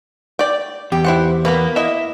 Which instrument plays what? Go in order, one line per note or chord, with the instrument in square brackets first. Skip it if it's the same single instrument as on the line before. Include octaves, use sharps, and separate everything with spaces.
[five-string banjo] D5 G5
[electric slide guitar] E2 [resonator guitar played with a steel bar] G4
[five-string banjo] E4 C5 F#5
[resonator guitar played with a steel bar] A#3 [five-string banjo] B3 A#4 B4
[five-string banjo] E4 D#5 [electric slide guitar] E5